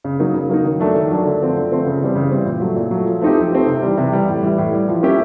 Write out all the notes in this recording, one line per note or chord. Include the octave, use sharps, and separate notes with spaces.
C#3
F#3 A#3 D#4
C#3
F#3 A#3 D#4
D#3
F#3 A3 D4
D#3
F#3 A3 D4
D3
F3 A3 C4
D3
F3 A3 C4
C#3
E3 G3 C4
C#3
E3 G3 C4
A#2
F#3 A3
A#2
F#3 A3
F3
A3 C4 D#4 G4
F3
A3 C4 D#4 G4
C3
E3 G3
C3
E3 G3
A2
E3 G3
A2
E3 G3
F3
A#3 C#4 E4 G4